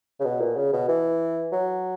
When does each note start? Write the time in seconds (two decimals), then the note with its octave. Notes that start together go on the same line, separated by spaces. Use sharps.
0.20 C#3
0.25 B2
0.41 A#2
0.56 C#3
0.73 B2
0.88 E3
1.52 F#3